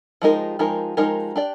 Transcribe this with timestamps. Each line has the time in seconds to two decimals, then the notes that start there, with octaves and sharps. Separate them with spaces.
0.22 F3 G#3 D#4 G4 A#4
0.59 F3 G#3 D#4 G4 A#4
0.97 F3 G#3 D#4 G4 A#4
1.36 D4 G4 D5